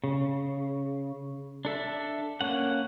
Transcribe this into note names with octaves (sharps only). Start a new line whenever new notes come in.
C#3
D4 A4 E5
A#3 C#4 F#5